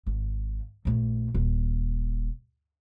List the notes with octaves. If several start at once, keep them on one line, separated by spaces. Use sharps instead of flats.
G#1
A#1 A3
D#1